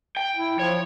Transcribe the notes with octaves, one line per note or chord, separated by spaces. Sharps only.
G5
E4
F3 C#5